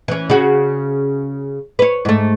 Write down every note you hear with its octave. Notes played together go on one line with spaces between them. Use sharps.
E3 C#4
C#3 F#4
B4 C#5
G#2 A3